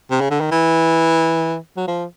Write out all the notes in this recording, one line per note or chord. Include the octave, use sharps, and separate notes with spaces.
C3
C#3
D3
D#3
E3
F#3
F3